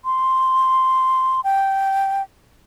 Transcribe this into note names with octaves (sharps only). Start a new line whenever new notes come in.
C6
G5